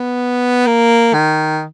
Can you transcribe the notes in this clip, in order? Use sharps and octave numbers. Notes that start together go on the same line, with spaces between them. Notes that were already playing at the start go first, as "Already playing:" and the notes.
Already playing: B3
A#3
D#3